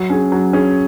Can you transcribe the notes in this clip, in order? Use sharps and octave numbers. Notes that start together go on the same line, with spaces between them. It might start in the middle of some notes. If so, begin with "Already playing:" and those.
Already playing: F#3
C#4 G#4
F#3
C#4 G#4